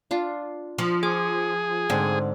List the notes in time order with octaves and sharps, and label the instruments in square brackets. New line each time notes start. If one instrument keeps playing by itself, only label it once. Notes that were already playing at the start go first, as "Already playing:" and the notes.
[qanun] D4 F4
[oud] F3
[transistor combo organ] G#4 [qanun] D6
[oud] G#2 [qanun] D3 C4